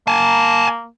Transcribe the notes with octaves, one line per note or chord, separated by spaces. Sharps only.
A#3 G#5 A5